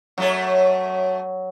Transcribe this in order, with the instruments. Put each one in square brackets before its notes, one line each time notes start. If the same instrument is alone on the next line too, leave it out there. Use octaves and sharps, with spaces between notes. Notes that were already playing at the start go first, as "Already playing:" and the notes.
[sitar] F#2 A3 C#5 [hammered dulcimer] F#3